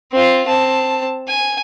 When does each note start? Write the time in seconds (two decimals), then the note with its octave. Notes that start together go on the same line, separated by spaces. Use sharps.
0.12 C4 F4
0.47 C4 A5
1.28 G#5